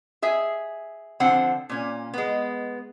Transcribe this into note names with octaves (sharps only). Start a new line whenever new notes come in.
G#4 E5 G#5
D3 F3 C4 F#5
A#2 C#4
G#3 B3